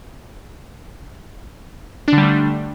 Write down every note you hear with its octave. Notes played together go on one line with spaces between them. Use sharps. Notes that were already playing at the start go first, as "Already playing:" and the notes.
D3 G3 A3 D4